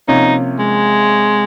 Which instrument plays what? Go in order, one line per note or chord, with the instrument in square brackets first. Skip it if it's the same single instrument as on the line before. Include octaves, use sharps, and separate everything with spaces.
[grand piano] C3 F3 A#3 C#4 [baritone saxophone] D#4
[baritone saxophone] G#3